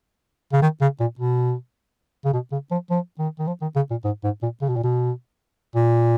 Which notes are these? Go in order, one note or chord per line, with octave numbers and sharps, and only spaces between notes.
C#3
D#3
C#3
A#2
B2
C#3
B2
C#3
F3
F3
D#3
D#3
F3
D#3
C#3
A#2
G#2
G#2
A#2
C#3
B2
A#2
B2
A#2